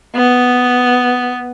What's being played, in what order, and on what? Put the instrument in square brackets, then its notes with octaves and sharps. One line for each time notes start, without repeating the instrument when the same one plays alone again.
[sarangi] B3